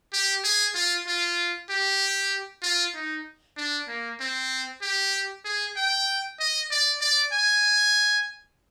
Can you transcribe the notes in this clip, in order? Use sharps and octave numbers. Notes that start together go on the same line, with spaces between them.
G4
G#4
F4
F4
G4
F4
D#4
D4
A#3
C4
G4
G#4
G5
D#5
D5
D5
G#5